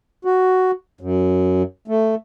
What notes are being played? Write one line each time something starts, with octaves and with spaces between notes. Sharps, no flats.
F#4
F#2
A3